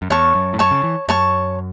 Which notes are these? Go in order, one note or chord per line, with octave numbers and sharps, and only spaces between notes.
F#2
E2 C#5 A5 C#6
F#2
A2
F#2 C#5 A5 C#6
C#3
E3
F#2 C#5 A5 C#6